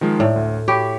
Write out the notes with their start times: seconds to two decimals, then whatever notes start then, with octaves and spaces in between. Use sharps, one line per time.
0.01 D#3 F3 G#3
0.20 A2 D5
0.36 D2
0.68 G4 C#5 B5 C#6